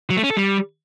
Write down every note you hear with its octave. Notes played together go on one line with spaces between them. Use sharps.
F#3
A3
C#4
A4
G3